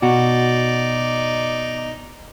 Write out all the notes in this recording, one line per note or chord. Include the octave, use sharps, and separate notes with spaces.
B2 D#4 F#4 D5